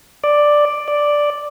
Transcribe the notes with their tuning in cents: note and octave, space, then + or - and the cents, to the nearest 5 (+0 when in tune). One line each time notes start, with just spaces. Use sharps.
D5 +5
D5 +0